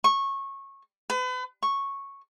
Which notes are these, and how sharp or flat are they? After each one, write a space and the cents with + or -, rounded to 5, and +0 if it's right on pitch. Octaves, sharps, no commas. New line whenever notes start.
C#6 -20
B4 +35
C#6 -5